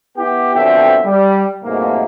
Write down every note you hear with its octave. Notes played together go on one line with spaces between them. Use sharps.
B3 E4 G4 G5
F2 B2 D3 C#5 E5 G5
G3
C2 F2 G#2 B2 A3 A#3